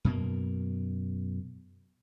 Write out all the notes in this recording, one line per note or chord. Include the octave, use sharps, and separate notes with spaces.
F#2 B2 A#3